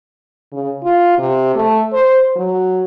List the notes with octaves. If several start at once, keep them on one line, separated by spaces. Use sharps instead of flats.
C#3
F4
C3
A3
C5
F#3